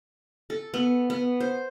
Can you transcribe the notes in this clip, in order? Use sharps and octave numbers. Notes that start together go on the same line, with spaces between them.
A4
B3
B3
C5